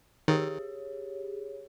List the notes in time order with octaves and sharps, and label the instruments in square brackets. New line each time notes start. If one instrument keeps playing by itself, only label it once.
[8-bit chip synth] D#3 [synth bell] G4 G#4 C#5